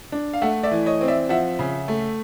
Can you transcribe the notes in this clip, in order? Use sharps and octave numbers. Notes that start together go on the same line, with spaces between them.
D4
F5
A3 E5 F#5
D5 E5
E3
C#5 D#5
C4
D5 E5
F3 E5 F#5
C#3
A3